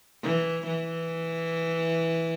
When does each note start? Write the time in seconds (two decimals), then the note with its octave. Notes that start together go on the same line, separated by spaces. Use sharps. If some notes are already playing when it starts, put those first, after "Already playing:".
0.23 E3
0.67 E3